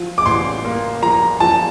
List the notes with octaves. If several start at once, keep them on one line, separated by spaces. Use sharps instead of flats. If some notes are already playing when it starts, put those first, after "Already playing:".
Already playing: F3
D6
A1 C6
A#3
F3 A#5
F3 A5